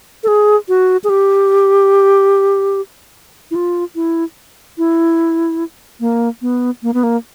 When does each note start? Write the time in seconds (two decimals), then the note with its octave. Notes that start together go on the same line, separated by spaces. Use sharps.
0.23 A4
0.28 G#4
0.69 F#4
1.04 G#4
1.09 G4
3.51 E4
3.55 F4
3.95 E4
4.78 E4
6.00 A#3
6.42 B3
6.83 A#3
6.94 B3
7.03 A#3